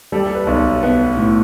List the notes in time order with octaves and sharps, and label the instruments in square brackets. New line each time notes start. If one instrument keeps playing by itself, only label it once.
[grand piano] G3 [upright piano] A4
[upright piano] G4
A4
B4
[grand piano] B1
[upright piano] A4
[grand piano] B3 [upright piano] B4
[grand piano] A2